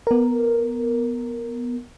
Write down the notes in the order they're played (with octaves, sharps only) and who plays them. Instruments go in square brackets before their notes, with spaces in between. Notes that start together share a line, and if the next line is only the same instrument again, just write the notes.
[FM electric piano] B3 A#4